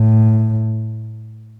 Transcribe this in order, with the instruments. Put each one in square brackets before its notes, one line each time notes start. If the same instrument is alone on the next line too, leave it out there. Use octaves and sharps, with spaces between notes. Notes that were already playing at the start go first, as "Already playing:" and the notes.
Already playing: [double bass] A2